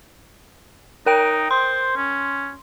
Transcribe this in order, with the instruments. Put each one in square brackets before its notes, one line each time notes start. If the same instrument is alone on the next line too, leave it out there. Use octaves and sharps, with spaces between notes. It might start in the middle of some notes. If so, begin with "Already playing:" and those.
[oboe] D#4 [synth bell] A#4 G5 D7
[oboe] C5 [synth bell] C6
[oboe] C#4